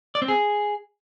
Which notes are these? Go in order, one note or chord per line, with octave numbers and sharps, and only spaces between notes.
D5
C4
G#4